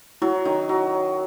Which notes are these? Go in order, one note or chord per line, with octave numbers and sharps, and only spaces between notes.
F#3 E4
D#3
F#3